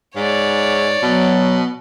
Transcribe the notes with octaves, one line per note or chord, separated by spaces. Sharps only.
G#2 C#5 D5
B2 F#3